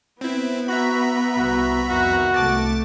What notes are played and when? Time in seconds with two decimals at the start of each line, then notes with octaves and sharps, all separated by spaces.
0.21 B3 C4 E4
0.68 F#4 E5 A#5 B5
1.38 C2 F#4
1.89 F2 D#3 F#4
2.34 C2 A3 A5 D6 A6